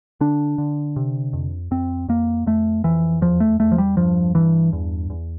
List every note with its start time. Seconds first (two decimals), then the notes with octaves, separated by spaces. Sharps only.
0.21 D3 D4
0.58 D3
0.96 C3
1.33 F2
1.71 F2 C4
2.08 F2 A#3
2.46 F2 A3
2.84 F2 E3
3.21 E2 F3
3.40 A3
3.60 E2 A3
3.72 F3
3.78 G3
3.97 G2 F3
4.35 G2 E3
4.73 E2
5.10 E2